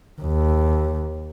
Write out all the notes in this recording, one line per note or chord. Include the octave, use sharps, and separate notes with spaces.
D#2